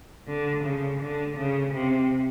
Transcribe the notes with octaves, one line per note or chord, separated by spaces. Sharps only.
D3
C#3
D3
C#3
C3